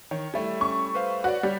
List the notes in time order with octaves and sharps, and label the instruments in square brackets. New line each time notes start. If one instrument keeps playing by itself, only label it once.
[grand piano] D#3 [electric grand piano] C#5
[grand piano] G3 A3 E4
[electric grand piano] C#4 [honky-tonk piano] C#6
[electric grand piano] B4 C5 F5
[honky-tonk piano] F#4 [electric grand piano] B4 C#5 D5
[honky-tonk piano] G3 [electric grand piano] C#5